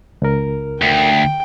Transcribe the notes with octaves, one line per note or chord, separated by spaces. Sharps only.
C#2 A#4
D2 G5